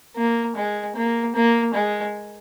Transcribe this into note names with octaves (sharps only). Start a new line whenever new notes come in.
A#3
G#3
A#3
A#3
G#3